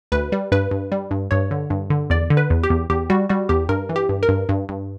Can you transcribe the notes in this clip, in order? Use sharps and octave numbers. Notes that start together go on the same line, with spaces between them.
D2 B4
G3
G2 B4
G2
G3
G2
G2 C#5
D3
G2
D3
E2 D5
D3
B4
E2
G4
E2
E2 G4
G3 F#4
G3 F#4
E2 G4
G2 A#4
E3
G4
G2
A#4
G2
G2
G2